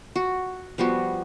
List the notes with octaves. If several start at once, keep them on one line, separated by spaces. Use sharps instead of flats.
F#4
F3 G3 B3 F#4